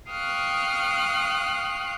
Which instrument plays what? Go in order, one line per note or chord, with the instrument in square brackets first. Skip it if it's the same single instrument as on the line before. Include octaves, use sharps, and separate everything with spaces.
[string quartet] F5 G5 C#6 D#6 F6 F#6